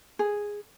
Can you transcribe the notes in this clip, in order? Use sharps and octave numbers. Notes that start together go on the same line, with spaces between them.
G#4